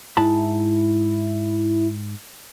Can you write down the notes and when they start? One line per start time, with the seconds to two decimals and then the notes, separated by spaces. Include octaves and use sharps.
0.17 G#2 E4 A5 B5